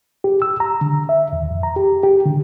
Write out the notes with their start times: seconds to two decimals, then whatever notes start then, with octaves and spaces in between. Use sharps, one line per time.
0.24 G4
0.42 E6
0.60 A#5
0.81 D3
1.09 E5
1.33 D#2
1.51 F2
1.63 A#5
1.76 G4
2.03 G4
2.26 D3